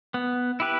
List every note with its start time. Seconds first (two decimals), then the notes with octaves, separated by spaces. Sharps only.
0.14 B3
0.60 E4 G4 B4